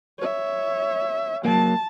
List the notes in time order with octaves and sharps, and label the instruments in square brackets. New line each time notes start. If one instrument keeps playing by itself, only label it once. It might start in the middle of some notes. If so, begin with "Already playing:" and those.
[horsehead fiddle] C#5 E5
[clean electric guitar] F#3 A#3 [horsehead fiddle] A5